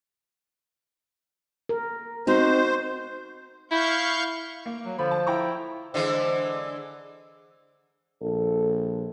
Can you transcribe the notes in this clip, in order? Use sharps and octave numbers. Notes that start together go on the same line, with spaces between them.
A#4
C4 D#4 F#4 C5
E4 F5 C#6 G6
A#3
F#3
D3 F3 B5
A5
E4 G5 A#5 C#6
D3 E3 G#3 C5
A#1 A4